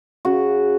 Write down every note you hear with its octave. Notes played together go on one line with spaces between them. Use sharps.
C#3 F#4